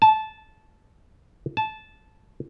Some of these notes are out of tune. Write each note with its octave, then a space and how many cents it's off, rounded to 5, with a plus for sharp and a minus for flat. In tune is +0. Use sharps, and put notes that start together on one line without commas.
A5 -15
A5 -15